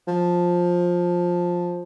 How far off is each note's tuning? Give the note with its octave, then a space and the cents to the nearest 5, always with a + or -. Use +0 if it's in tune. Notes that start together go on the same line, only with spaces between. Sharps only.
F3 +10